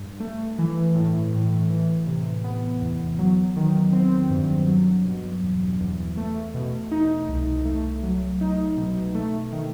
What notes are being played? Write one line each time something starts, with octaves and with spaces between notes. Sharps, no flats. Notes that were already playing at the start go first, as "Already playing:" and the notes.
Already playing: G2
A3
E3
A2
A2
E3
C3
B3
E2
F#3
D#3
C4
G2
F#3
B2
E2
E2
A3
B2
D#4
C2
A3
F#3
D#4
B2
A3
D#3